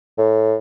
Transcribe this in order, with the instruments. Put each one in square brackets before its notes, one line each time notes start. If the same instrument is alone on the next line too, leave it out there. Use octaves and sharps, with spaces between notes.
[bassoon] A2